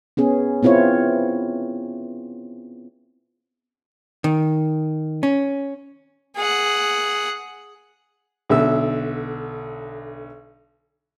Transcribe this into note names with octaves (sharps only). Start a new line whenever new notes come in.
B3 C#4 G#4
B3 C4 E4 F4 C#5
D#3
C#4
G#4 F#5
B1 D3 E5 E6